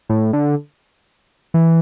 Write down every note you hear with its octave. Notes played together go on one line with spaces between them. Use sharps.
A2
D3
E3